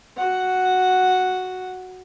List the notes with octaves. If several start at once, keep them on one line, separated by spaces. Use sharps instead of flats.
F#4 F#5